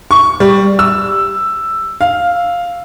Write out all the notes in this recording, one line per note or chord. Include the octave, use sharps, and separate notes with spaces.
C#6
G3
E6
F5